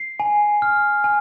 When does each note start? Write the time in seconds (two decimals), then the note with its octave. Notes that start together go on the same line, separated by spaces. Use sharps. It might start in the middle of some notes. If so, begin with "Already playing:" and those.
Already playing: C7
0.20 G#5
0.62 F6
1.04 G#5